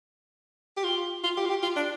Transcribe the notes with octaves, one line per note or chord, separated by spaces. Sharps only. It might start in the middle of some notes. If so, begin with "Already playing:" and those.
G4
F4
F4
G4
F4
G4
F4
D4